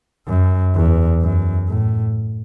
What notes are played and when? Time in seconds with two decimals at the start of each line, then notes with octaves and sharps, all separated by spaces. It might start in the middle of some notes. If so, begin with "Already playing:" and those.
0.28 F#2
0.75 E2
1.22 F#2
1.68 A2